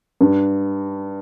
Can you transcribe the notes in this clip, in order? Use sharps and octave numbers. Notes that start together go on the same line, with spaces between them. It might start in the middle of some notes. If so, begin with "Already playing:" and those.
G2